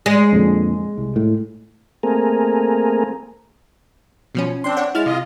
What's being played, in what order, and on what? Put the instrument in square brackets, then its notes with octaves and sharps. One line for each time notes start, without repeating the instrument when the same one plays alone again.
[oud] G#3
[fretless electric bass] F2 A#2 D3
C2
A2
[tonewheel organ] A3 A#3 C4 G#4 A#4
[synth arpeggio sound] B2 F3 C#4
[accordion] C4 D4 [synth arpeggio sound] C6 G6
[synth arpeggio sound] C#5 F#5 G5
[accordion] G#3 [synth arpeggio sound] E4 F6 A6
[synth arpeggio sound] C3 [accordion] F4 D#5